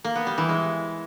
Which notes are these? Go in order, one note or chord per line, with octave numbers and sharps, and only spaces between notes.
A#3
B3
G3
E3
G#3